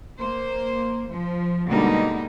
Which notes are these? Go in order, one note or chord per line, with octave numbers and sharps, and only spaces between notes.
A#3 C5
F3
B2 D3 G3 G#3 A#3 D#4